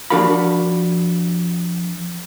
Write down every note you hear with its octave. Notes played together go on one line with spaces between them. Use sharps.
F3 D4 F#4 A#4 F5 B5